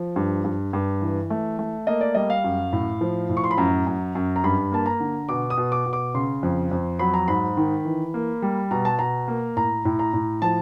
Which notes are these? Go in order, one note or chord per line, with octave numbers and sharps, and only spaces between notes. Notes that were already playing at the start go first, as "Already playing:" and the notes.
Already playing: F3
G2
G2
G2
E3
A3
A3
A#3 D#5
D5
G3 D#5
F5
F#2
A2
F3
A2
C#6
C6
B5
F#2 A#5
F#2
F#2
A#5
G2 B5
A#3 A5
A#5
D3
B2 D6
D#6
B2
D6
B2
D6
C#3 C6
F2
F2
F#3 B5
A#5
G#2 B5
D#3
E3
A#3
G3
B2 A#5
A5
B2 A#5
A#3
A2 A#5
A2
A#5
A2
F3 A5